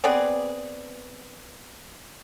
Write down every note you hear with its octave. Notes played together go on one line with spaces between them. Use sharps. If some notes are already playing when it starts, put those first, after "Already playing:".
B3 C4 G#4 D5